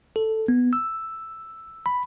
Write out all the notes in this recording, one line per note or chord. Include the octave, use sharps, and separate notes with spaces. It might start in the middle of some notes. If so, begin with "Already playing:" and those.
A4
B3
E6
B5